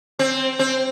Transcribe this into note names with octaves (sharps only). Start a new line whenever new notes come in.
C4
C4